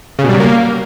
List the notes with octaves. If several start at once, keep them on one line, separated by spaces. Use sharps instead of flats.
C#3
B2
G3
F#3
A#3